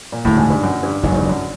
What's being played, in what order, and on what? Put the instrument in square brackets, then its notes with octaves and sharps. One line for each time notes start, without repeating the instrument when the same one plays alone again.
[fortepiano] A#2
[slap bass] E1 D2 C#3 [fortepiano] A2
[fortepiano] G#2
G2
F#2
G2
[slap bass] F#1 E2 C#3 F#3 [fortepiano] G#2
[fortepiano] G2
F#2